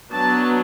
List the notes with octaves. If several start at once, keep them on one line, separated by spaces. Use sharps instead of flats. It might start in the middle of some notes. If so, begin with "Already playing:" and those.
F#3 B3 D4 A5